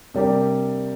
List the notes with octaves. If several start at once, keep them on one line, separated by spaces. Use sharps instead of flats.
C3 G3 A#3 D4 G4